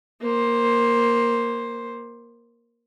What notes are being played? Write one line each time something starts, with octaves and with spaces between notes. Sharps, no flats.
A#3 C5